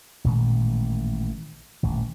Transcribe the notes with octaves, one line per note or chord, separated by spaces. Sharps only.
A1 A#2 D#3 G#3
D#1 A1